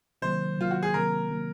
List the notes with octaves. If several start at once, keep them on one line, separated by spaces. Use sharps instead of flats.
C3 D#3 F#3 A#3 C5
C3 D#3 F#3 A#3 F4
F#4
G#4
C3 D#3 F#3 A#3 A#4
C3 D#3 F#3 A#3